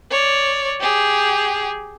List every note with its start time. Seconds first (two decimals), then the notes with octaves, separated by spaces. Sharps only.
0.10 C#5 D5
0.80 G4 G#4